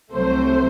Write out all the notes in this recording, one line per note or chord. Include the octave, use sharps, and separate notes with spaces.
C2 C3 F#3 A3 C5